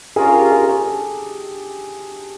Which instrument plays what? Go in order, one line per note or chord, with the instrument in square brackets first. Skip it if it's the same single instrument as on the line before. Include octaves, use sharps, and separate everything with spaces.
[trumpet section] C#4 F4 A#4 [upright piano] G#4
[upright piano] G4
G#4
G#4
A4